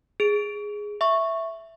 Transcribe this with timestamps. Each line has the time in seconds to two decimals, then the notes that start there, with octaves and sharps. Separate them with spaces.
0.20 G#4 D7
1.01 E5 C#6